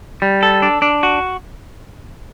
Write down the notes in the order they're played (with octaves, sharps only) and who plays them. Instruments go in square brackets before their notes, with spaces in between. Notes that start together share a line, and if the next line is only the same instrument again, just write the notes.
[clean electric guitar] G3
A4
D4
D4
F#4